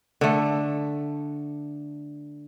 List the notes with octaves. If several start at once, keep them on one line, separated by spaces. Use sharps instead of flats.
D3 A3